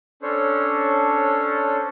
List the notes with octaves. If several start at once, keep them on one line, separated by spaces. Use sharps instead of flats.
C#4 D4 A4 C5 C#5